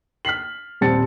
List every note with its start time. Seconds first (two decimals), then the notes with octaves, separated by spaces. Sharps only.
0.25 F6 B6 C7 F#7
0.81 D#1 G3 C4 A5 A6 C#7